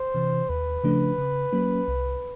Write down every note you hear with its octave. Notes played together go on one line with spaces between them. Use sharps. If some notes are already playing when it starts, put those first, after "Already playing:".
Already playing: C5
C3 E3
D#2 B4
C#3 F3 A3 D4
C#3
F#3 A#3 C#4
C2